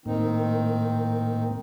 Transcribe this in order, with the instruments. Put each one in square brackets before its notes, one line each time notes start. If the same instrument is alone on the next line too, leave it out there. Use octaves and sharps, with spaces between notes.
[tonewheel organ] A2 A#3 [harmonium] D#3 C4 D#4